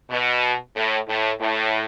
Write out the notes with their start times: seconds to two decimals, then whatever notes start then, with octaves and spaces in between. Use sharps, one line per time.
0.09 B2
0.76 A2
1.08 A2
1.40 A2